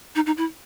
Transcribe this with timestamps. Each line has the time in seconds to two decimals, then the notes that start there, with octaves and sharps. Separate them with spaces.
0.16 D#4
0.26 D#4
0.37 E4